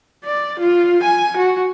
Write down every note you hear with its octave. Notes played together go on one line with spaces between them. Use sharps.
D5
F4
G#5
F#4